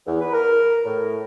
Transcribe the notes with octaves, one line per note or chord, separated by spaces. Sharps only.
E2
B4
A#4
A2